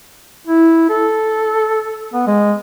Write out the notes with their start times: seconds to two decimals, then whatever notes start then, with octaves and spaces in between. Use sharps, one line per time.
0.47 E4
0.90 A4
2.13 B3
2.27 G#3